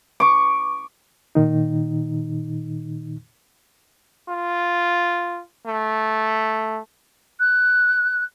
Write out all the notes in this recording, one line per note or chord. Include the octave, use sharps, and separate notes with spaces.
C#6 D6
A#2 D#3 D#4
F4
A3
F#6